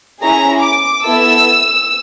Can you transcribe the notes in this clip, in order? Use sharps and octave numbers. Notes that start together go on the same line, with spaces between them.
C#4 E4 G#4 A#5
D6
B3 E4 A4 E6